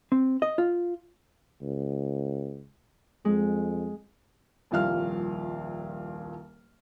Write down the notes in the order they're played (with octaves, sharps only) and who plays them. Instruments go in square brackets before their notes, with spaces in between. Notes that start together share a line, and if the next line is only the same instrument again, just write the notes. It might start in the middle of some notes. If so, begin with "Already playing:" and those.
[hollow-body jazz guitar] C4
D#5
F4
[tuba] C#2
[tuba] F2 [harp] G#3
[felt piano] D#1 C2 F3 F5 F6